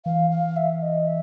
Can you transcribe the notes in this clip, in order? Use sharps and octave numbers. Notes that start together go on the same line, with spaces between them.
E3 F5
F5
E5
D#5
E5